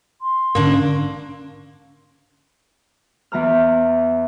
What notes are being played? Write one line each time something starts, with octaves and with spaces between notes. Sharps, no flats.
C6
G#2 D3 A#3 C#4 D4
E2 E3 A#5 F6